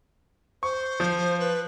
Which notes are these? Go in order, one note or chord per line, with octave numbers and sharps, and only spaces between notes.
C5 C#6
F3
B4